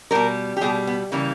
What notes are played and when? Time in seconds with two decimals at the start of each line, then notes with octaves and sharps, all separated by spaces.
0.11 B2 G3 A#4
0.57 G4
0.61 B2 G3 G#4
0.87 B3
1.12 C#3 E3 G3 A#3